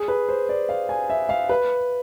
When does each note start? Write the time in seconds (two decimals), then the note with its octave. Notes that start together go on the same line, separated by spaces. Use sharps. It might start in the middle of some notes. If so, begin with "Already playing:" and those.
Already playing: G#4
0.08 B4
0.29 C5
0.49 D5
0.69 F5
0.89 G#5
1.10 E5
1.29 F5
1.49 B4